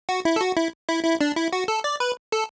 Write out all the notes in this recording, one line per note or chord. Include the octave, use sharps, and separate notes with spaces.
F#4
E4
A4
F#4
E4
E4
E4
D4
E4
F#4
A4
D5
B4
A4